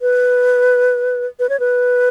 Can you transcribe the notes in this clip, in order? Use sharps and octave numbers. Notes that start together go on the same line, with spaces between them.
B4
B4
C#5
B4